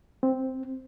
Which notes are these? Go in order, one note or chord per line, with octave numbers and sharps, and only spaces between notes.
C4